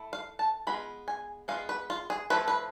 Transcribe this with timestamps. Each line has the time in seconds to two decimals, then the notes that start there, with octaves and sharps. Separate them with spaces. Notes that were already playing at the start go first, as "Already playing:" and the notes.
Already playing: A3 E4
0.13 F5
0.39 A5
0.67 G#3 B3 F4 B5
1.08 G#5
1.48 G#3 B3 F4 F5
1.69 B4
1.90 F4
2.10 G#4
2.30 F3 A3 E4 B4
2.48 B4